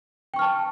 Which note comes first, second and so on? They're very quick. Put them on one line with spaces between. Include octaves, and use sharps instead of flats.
G5 C#6 F6 A5